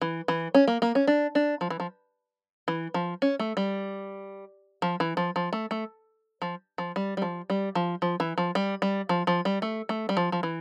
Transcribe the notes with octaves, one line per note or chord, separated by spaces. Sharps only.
E3
E3
C#4
A#3
A#3
C#4
D4
D4
F3
E3
F3
E3
F3
C#4
A3
G3
F3
E3
F3
F3
A3
A3
F3
F3
G3
G3
F3
G3
F3
F3
E3
F3
G3
G3
F3
F3
G3
A3
A3
G3
F3
F3
E3